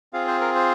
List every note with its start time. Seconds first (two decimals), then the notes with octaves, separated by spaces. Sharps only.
0.13 C4 F4 G#4 F5
0.27 C5
0.41 A#4
0.55 C5